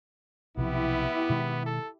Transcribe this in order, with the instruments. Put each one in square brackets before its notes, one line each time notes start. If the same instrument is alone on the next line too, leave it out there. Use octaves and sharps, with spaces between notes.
[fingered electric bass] B1 C3 F3 [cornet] B3 [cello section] E4 G4
[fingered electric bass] B2 D#3 G#3
[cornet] A4